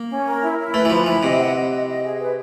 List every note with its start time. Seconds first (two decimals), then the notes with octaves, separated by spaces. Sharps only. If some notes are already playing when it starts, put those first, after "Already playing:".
Already playing: A#3
0.10 C#4
0.25 A#4
0.42 E4
0.58 E4
0.74 A3 B4
0.85 E3
0.90 F3 B4
1.06 E3 B4
1.23 C3 D#5
1.39 F#5
1.55 D#5
1.71 D#5
1.87 D#5
2.03 G#4
2.19 B4